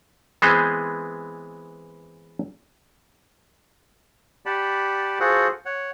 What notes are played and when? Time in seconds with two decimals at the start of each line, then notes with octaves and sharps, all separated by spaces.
0.42 E3 G#3 B3 C4 G#4 C5
4.46 G4 D5 F#5 A5 B5
5.20 F4 F#4 G#4 A4 C5 F#5
5.66 C#5 F#5